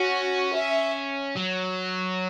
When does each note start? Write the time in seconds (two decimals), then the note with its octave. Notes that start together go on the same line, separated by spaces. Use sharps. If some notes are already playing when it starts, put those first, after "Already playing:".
Already playing: C#4 F#4
0.56 E5
1.37 F#3